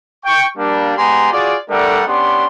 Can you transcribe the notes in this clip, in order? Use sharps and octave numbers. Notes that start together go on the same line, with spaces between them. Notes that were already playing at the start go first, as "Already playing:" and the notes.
G5 C#6
G3 A#3 D4
G#3 B3 G4 G#5 A#5 C6
F4 F#4 G#4 D5
G3 A3 D4 A4 A#4 F#5
B3 C#4 D4 G4 C6